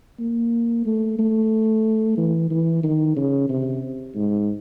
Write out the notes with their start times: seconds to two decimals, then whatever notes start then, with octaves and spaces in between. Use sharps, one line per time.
0.19 A#3
0.85 A3
1.18 A3
2.17 E3
2.50 E3
2.83 D#3
3.16 C#3
3.49 C3
4.15 G#2